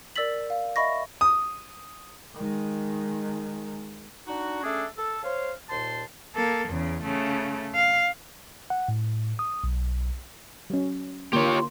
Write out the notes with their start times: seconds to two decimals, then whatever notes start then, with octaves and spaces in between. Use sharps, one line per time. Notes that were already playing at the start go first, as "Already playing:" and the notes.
0.16 A#4 D5 E6 A6 B6 F#7
0.50 F5
0.76 D#5 E5 B5 C#6 A#6
1.21 D#6
2.37 D#3 G#3
4.28 D4 D#4 F#4
4.64 A3 C#4 D4 G#4 A4
4.97 A4
5.24 C5 C#5 F5
5.70 D#2 A#2 C5 A5 C6
6.35 A#3 A4
6.69 E2 C#3
7.03 C#3 A3
7.75 F5
8.70 F#5
8.88 A2
9.39 D#6
9.64 B1
10.70 F#3 C#4
11.33 D3 A#3 F4 G4 C#5